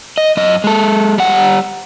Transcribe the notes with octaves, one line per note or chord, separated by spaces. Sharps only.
D#5
F#2 D#5
G#3 A4
G3 F#5